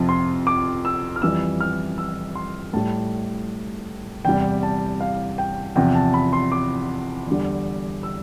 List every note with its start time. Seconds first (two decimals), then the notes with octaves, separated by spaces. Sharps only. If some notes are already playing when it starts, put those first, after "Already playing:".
Already playing: F2 C3 F3 A5
0.09 C6
0.47 D6
0.85 E6
1.16 F6
1.22 F2 E3 G3 E6
1.61 F6
1.98 E6
2.36 C6
2.73 A2 G3 A5
4.25 E2 C3 G3 G5
4.63 A5
5.00 F5
5.38 G5
5.76 E2 C3 F3 G5
5.95 A5
6.14 B5
6.33 C6
6.52 D6
7.27 E2 D3 G3
8.03 E6